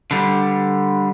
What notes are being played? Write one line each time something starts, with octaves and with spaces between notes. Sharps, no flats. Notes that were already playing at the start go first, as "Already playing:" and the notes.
D3 G3